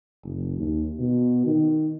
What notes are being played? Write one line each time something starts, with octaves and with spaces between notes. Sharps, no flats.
F#1
D#2
B2
D#3